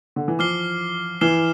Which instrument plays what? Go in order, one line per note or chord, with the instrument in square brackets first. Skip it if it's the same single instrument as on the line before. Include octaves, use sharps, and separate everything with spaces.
[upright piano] D3
E3
[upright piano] F3 [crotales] D6 F6 C7 G7
[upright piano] E3 [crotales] F6 C7 E7 G7